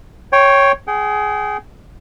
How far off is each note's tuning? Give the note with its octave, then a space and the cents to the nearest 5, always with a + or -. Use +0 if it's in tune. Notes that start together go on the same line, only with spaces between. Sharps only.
C#5 +0 G5 +0 C6 +30
G#4 +10 G5 -35